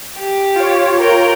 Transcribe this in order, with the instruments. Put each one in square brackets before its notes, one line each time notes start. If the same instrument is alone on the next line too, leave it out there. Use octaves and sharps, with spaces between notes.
[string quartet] G4
[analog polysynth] F4 C#5
[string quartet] A#4 G5